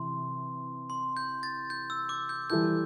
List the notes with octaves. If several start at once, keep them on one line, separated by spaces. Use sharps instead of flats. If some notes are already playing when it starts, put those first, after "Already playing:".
Already playing: C3 E3 C6
C6
G6
A6
G6
E6
D6
G6
E3 G3 E4 A4 G6